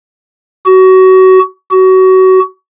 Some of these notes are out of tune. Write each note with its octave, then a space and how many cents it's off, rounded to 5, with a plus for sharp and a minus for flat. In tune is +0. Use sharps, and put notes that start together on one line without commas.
F#4 +25
F#4 +25